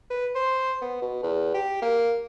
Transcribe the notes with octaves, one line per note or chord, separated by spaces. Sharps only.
B4
C5
B3
B2
E2
G4
A#3